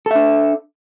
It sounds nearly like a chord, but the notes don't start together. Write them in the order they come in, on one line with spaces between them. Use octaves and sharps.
A4 E5 D4